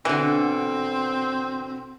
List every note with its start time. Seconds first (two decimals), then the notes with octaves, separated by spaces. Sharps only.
0.05 B2 D3 E3 C4